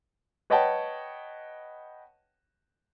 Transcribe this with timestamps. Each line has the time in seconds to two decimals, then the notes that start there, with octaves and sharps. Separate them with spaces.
0.50 B4 C#5 D#5 F#5 G5 A5